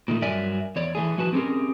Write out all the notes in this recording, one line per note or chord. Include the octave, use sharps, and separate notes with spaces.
A#2 D#3 G#3 A3
G2 F#3 A#4 D5 E5 G#5
E2 C#5 D5
E3 A3 G#4
A2 F3 F#4 B4 A5
C4 C#4 G4 G#4 A#4